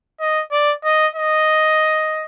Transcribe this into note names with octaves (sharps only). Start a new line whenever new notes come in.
D#5
D5
D#5
D#5